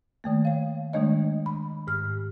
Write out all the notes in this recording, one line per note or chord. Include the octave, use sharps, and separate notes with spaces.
D#3 A3 A#3
C#5 F5
D#3 G#3 A3 D4 C#5 D#5
B5
G#2 F6